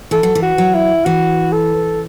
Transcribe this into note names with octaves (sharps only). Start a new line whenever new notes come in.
E3 A4
F#3
E3
F#4
F#3
E4
E3 F#4
A4